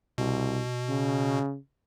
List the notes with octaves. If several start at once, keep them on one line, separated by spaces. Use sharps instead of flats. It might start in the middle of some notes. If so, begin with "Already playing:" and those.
C2 B2
C#3